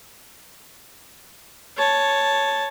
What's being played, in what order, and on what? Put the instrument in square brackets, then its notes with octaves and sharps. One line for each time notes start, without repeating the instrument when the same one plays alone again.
[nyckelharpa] C#5 A5